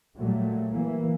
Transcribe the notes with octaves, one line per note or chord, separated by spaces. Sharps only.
A#2 F#3 G3 A3
E3 A#3